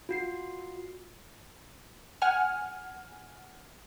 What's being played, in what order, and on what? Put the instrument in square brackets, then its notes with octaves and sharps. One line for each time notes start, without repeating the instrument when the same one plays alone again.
[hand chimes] F4 F#4 C7
[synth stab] F#5 G#5 F6